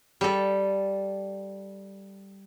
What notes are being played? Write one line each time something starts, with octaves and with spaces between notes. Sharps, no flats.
G3 A4